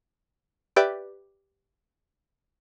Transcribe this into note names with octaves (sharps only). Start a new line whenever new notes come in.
G4 B4 D5 E5 G5 D6